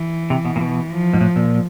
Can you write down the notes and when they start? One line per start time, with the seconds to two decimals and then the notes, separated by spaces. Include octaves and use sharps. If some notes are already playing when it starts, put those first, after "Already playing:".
Already playing: E3
0.30 C3
0.45 B2
0.56 A#2
0.61 B2
0.91 F3
1.14 G#2
1.21 A2
1.36 A#2